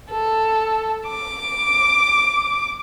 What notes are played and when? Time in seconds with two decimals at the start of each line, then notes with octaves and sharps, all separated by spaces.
0.11 A4
1.08 D6